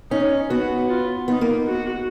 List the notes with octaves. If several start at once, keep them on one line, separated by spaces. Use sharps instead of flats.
C#4 D#4
B3 F#4
F4
B3 D#4
A#3
F#4